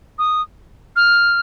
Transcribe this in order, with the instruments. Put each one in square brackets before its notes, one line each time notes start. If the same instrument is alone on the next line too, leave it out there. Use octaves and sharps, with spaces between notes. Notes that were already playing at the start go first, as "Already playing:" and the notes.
[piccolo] D#6
F6